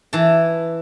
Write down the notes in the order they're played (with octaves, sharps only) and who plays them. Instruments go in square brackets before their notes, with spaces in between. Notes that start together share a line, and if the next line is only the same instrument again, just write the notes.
[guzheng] E3 A5